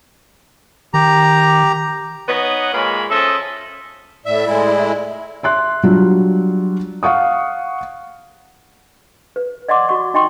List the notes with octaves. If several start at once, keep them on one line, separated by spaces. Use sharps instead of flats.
D#3 G4 A#5
B3 D#4 C#5 D#5 F#5
A#2 G#3 A#3 C#5 B5
F3 C#4 A4 D#5 E5
A2 D5 E5
A2 G#3 E4
E5 C6 F#6
F#3 G3 D4 F4
F5 F#5 C#6 D#6
B4
D5 D#5 F#5 C6 D6
F#4 D#5 C#6
D#4 D#5 G5 C6 C#6